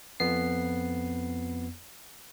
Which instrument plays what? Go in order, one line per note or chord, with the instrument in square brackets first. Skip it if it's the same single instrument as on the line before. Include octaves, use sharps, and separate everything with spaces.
[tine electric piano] F2 B3 C7